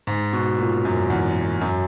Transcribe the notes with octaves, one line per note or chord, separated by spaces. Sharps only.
G#2
B2
A#2
F#2
E2
F#2